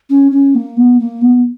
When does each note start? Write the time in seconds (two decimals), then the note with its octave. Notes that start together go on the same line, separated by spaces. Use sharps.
0.10 C#4
0.31 C#4
0.55 A#3
0.77 B3
0.99 A#3
1.21 B3